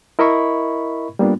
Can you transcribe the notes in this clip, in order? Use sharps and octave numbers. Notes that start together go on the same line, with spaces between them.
E4 A#4 D#5 E5 B5 C#6
G3 A#3 B3 D4 F4